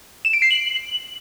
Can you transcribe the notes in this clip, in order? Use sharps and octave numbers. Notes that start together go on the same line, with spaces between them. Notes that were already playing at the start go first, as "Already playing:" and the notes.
E7
D7
C7
F#7